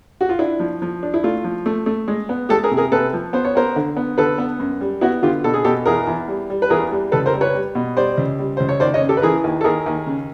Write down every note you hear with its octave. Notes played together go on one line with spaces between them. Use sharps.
F#4
F4
D4 E4
F3
F3
D4
E4
A3 F4
F3
A3
A3
G#3
B3
G#3 G4 A4
G#4 A#4
C3
G#4 A#4
C3 A4 B4
F3
B3 C5
C#5
B3 A#4 C5
D3
B3
D3 A4 B4
B3
F#2
G3
B3 E4 F#4
D3 F4 G4
B2 A4
G#4
B2 G4 A4
E2 G#4 A#4
E2
G3
G3
B4
E2 G#4 A#4
G3
C#2 A4 B4
A#4 C5
G3
B4 C#5
G3
B2
G3 C5 D5
C#2
G3
C#2 C5
C#5
D#2 C5 D5
C#5 D#5
C#3
G4 A4
B4
E3 G#4 A#4
D#2
A4
D#2 G#4 A#4
D#2
C#3